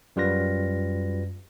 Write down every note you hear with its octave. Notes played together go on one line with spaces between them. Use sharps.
F#2 G3 F4 B4 A#6